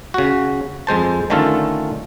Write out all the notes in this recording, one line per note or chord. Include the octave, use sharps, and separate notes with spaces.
C#3 F#4
F2 G#3 C5 A5
D3 D#3 A3 C#4 F4 A4